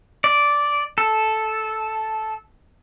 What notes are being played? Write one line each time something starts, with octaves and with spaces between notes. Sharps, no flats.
D5
A4